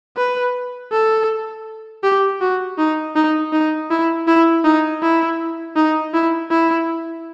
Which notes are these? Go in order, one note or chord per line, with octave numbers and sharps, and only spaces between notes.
B4
A4
G4
F#4
D#4
D#4
D#4
E4
E4
D#4
E4
D#4
E4
E4